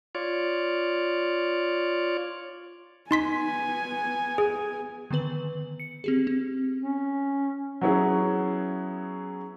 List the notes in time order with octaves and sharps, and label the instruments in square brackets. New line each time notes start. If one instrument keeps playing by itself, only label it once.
[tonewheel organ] F4 C#5 D5
[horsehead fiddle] B3 G#5 [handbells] D#4 C6 B6
[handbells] G#4
[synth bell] D3 D#3 B3 B4 F#7
C#7
C4 G4 G#4
C4
[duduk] C#4
[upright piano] F#3 B3 C#4 E4 G#4